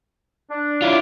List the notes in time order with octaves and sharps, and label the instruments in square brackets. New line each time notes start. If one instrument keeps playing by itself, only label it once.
[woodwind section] D4
[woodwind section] F#3 F5 D6 [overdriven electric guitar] E4 F4